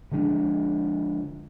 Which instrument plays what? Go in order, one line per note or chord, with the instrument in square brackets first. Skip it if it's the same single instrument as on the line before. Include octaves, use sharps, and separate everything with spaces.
[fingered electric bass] D3 F3 G#3 D4